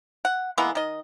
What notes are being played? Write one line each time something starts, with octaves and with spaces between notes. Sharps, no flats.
F#5
E3 G#3 A#3 B3
D#3 D#5